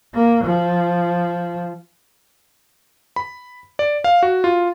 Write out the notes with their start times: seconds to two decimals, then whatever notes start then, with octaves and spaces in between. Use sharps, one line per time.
0.15 A#3
0.44 F3
3.16 B5
3.79 D5
4.04 F5
4.23 F#4
4.44 F4